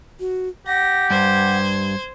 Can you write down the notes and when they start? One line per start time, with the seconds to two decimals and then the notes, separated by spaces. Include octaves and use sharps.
0.20 F#4
0.67 G4 F#5 A#6
1.10 G2 C5 G#6